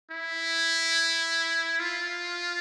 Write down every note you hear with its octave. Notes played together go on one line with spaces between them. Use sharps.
E4
F4